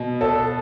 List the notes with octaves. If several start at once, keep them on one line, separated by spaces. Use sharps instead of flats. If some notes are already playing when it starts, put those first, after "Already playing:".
Already playing: B2
A4